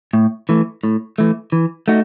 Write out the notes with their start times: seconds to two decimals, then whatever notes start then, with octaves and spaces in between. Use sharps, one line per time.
0.13 A2
0.49 E3 A3
0.83 A2
1.18 E3 A3
1.52 E3
1.88 A3 D#4 F#4